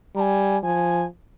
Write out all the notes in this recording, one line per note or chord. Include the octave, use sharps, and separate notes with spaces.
G3 G#5 A#5
F3 G#5